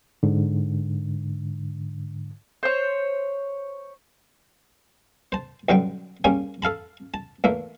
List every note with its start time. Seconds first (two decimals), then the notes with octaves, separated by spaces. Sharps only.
0.23 G#2 D3
2.63 C5 C#5
5.32 C5 A5
5.69 B1 F#2 D3 G3 G5
6.24 G3 A#3 C#4 G#4
6.62 A4 F5 A5 B5
7.14 A5
7.44 E2 A3 A#3